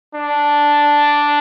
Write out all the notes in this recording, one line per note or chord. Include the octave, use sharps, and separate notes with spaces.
D4